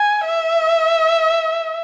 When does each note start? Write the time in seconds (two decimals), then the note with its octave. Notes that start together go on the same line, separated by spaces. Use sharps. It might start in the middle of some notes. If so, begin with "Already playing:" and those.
Already playing: G#5
0.27 E5